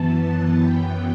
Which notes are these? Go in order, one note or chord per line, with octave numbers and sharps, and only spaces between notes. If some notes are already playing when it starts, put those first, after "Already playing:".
Already playing: F#2 E3 B3 A5
A5
F#2 E3 B3 G5